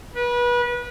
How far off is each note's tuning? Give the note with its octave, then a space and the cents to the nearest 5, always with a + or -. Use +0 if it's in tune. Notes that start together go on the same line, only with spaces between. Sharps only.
B4 -30